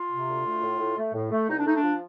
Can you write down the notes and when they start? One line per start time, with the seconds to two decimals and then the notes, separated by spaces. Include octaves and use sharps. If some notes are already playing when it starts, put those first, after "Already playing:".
Already playing: F4
0.11 C3
0.28 D2
0.45 A3
0.62 A2
0.79 A2
0.97 A3
1.14 A2
1.31 A3
1.48 C2 D#4
1.57 D4
1.65 A3 D#4
1.74 D4
1.82 F3